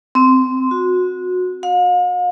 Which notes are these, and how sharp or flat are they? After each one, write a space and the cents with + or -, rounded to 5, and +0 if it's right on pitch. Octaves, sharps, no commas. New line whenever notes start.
C4 -10
F#4 -20
F5 +45